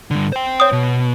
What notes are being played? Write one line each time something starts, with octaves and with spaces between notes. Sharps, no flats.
G2 D3
C5 G5
C#5 D#6
B2